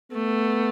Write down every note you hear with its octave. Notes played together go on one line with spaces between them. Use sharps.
A3 B3